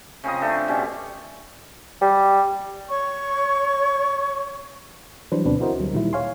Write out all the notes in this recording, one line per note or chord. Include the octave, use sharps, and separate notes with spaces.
C#3 C4 F4 D#5
A3 D4 A4
B2 G3 C#4
G3
C#5 C#6
E3 F#3 G3 D4 B4 C5
D2 B2 C4 D4 B4
E4 F#4 A#4 C5 D#5
D2 F#3 G3
A#2 D#3 G3 E4
C#5 F5 G#5 C6